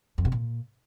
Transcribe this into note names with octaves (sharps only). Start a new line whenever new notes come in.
F2
B2
A#2